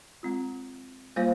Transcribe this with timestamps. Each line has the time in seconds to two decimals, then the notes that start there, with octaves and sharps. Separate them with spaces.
0.23 G#3 C4 F4
1.16 G3 A#3 F4 C5 F5